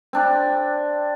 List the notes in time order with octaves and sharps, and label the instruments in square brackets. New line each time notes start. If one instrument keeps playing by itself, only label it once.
[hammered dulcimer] C4 D4 D5